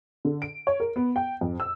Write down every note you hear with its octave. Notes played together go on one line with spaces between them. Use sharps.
D3
D7
C#5
A#4
B3
G5
F2
E6